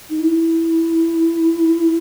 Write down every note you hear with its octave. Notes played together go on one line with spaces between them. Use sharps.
D#4
E4